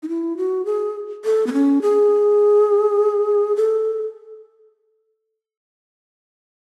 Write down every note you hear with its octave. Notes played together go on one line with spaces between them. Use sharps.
D#4
E4
F#4
G#4
A4
B3
C#4
G#4
A4